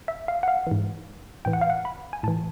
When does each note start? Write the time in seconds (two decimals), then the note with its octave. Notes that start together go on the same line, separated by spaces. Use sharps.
0.08 E5
0.28 F5
0.43 F#5
0.48 F5
0.67 G#2 E3
1.45 A2 E3 G5
1.53 F#5
1.61 F5
1.70 F#5
1.85 B5
2.13 G#5
2.23 A2 E3 A5